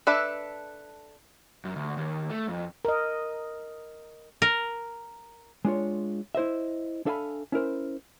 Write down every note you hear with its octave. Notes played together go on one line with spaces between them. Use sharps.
D4 A4 B4 E5
F#2
D2
D#2
A3
F2
A#4 D#5
A#4
G#3 D4 F4 C#5
E4 C5 D#5 E5
D4 A4 E5 F5 G#5 B5
C#4 E4 A#4 C5